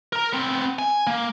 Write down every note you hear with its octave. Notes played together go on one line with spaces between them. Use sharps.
A#4 A#5
B3 C4
G#5
A#3